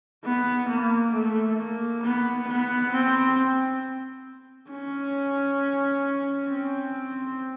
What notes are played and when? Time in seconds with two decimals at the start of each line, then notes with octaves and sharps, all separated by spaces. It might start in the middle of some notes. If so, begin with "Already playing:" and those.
0.24 B3
0.68 A#3
1.13 A3
1.58 A#3
2.03 B3
2.47 B3
2.92 C4
4.70 C#4
6.48 C4